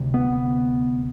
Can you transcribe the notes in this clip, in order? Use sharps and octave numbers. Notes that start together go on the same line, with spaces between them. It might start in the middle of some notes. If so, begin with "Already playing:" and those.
Already playing: D2 C3
B3